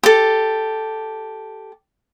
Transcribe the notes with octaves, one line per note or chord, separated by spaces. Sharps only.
G4 A4